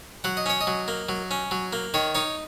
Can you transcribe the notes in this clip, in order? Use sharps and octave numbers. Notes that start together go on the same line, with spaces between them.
F#3 F#5
D#5
C#4 C#5
D#5
F#3
A#3
F#3
C#4
F#3
A#3
D#3 C#5
D#4 C#5